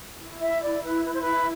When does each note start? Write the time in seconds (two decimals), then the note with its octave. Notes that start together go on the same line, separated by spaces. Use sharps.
0.19 E4
0.41 E5
0.62 D5
0.84 B4
1.05 B4
1.14 C5
1.22 B4